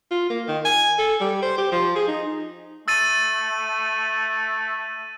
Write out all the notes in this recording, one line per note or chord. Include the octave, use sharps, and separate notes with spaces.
F4
A#3
D#3
G#5
A4
G3
C5
G4
F3
G#4
D#4
A3 E6 A6 D#7